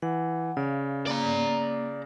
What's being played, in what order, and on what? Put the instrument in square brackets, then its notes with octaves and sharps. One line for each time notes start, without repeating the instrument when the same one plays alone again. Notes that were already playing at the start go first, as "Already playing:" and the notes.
[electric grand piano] E3 [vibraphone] F#5
[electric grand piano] C#3 [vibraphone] D5 F5
[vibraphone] A#3 [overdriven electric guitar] D5 A#5